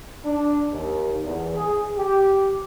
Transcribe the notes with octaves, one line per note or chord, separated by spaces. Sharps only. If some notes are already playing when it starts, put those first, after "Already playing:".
D4
D#2
E2
G#4
G4